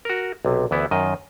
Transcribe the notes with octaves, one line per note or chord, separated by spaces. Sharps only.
F#4 A#4
B1 C3
D2 E3 B3 E4
F#2 D#3 D#5